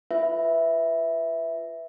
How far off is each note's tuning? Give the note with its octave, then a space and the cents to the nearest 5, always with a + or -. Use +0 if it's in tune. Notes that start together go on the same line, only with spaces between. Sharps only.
F4 -25 B4 +5 E5 -5